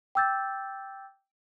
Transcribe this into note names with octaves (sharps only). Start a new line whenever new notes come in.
G5 D6 E6 G6 A6